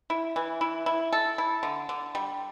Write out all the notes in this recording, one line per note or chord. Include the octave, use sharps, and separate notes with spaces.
E4
E3
E4
E4
A4
E4
D3
D3
G3